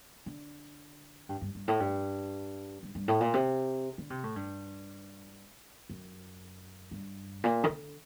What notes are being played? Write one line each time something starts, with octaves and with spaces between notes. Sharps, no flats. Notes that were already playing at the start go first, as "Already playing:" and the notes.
D3
G2
G2
G2
A2
G2
G2
G2
A2
A#2
C3
D3
C3
A2
G2
F#2
G2
A#2
D#3
D3